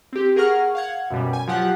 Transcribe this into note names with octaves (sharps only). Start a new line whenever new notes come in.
C4 G4
G#4 A#4 F#5 C#6 F6
F5 F#5 G#6
F#2 B2 G3
G#5
F3 F#3 F4 G4 F#5 F#6